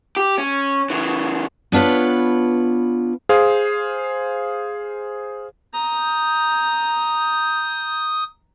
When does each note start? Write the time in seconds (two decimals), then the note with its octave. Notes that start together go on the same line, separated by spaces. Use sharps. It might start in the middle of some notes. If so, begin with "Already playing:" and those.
0.17 G4
0.38 C#4
0.90 C#3 E3
1.72 B3 D4 F4 B4 C#5
3.29 G#4 C5 F5 C6 D#6
5.73 A#5 D#6 G6